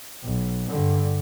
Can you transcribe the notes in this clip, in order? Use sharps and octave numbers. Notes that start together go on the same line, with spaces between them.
B1
G2 D3